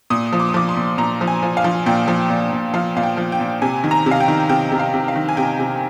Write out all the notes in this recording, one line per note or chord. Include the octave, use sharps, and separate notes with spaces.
A#2 D#6
F3
D6
D#6
F3 D6
C6
A#2
A#2 A#5
F3
G#5
F3
F5
F3
A#2 G5
F3
A#2
A#2
F3 F5
A#2 F5
G5
F3
G5
A#2
C3 G#5
D#3
A#5
C3
F5
G5
D#3
C3 G5
C3
F5
C3
F5
D#3
G#5
C3 G5
C3